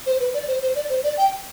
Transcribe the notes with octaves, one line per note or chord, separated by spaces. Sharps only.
C5
B4
D5
C5
C5
D5
C5
D5
G5